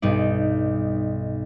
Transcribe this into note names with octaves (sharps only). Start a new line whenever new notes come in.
B1 G2 D#4 D5